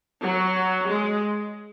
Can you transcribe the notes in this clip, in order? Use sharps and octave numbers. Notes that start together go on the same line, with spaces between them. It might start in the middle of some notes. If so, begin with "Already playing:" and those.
F#3
G#3